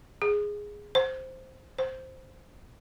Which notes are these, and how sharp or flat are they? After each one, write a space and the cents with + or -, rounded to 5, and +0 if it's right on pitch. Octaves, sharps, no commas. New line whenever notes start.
G#4 -5
C5 +0
C5 +0